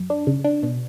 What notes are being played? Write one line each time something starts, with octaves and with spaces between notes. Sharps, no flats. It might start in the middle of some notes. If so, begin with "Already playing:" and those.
Already playing: F#2
D4
C#3
D4
B2